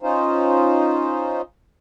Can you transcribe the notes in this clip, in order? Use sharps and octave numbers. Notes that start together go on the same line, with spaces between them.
C#4 D#4 F4 C5